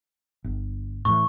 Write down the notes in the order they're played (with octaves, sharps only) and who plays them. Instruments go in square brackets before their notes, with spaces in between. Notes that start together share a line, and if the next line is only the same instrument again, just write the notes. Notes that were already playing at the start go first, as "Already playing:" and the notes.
[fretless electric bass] G1
[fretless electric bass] A2 E3 [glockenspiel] C#6